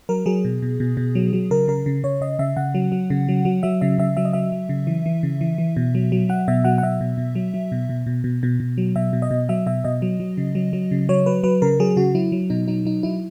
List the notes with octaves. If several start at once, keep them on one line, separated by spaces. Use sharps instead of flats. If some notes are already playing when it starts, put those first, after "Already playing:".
F#3 A#4
F#3 G#4
B2
B2
B2
B2
F#3
F#3
C#3 A#4
C#3 A#4
C#3
C#3 C#5
C#3 D#5
C#3 E5
C#3 F#5
F#3
F#3
C#3
F#3
F#3
F#3 E5
C#3 E5
C#3 E5
F#3 E5
D#5
F#3 E5
F#3
C#3
E3
E3
C#3
E3
E3
B2
F#3
F#3
F#3 F#5
B2 E5
F#3 F#5
F#5
B2 E5
B2
B2
F#3
F#3
B2
B2
B2
B2
B2
B2
F#3
B2 E5
B2
D#5
B2
F#3 E5
B2 E5
B2 D#5
F#3
F#3
C#3
F#3
F#3
C#3
F#3 C#5
F#3 B4
F#3 B4
C#3 A#4
F#3 G#4
C#3 F#4
F#3 E4
F#3
B2 D#4
F#3 D#4
F#3 D#4
F#3 E4